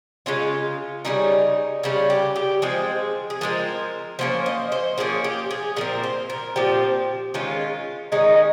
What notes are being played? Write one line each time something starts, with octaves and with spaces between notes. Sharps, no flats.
C#3 G#3 C#4 F4
C#3 G3 C#4 D#4
C#3 G3 C#4 F4
G4
G4
F3 G#3 C4 G#4
G#4
F3 G#3 C4 A#4
F3 A#3 C#4 C5
D#5
C5
F3 A#3 C#4 G#4
G4
G#4
A#2 F3 C4 A#4
C5
A#4
A#2 F3 C4 G4
D#3 G#3 C#4 F4
D#3 G#3 C#4 D#4